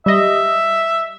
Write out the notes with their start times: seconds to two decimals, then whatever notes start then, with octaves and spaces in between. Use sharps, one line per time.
0.06 G3 D#5 E5